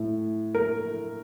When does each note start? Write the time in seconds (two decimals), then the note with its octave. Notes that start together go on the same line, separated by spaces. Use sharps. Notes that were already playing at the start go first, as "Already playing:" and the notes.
Already playing: A2 A3
0.55 A#4